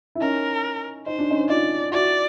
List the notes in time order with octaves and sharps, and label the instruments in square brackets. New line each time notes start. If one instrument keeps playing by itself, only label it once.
[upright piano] E4
[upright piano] C#4 D#4 [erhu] A#4
[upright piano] D#4 [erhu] C5
[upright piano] D4
C#4 D#4
[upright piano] D#4 F4 [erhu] D5
[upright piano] E4 F#4 [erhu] D5